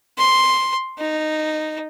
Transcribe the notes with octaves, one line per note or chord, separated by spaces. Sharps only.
C6
D#4